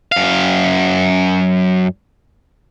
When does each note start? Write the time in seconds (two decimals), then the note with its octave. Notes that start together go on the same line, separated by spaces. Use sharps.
0.12 F#2 F5